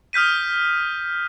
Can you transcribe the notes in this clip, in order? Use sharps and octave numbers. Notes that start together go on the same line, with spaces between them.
D#6 F6 G6 B6 D#7